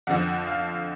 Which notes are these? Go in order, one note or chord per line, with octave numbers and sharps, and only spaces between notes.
F2 D3 F3 F#5
F5